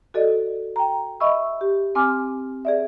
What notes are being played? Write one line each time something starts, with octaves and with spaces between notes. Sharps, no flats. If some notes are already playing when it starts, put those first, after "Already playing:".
F#4 A4 D5 D#5
G5 A#5
D#5 E5 B5 C#6 E6
G4
C4 G#5 D6 F6
G#4 D5 E5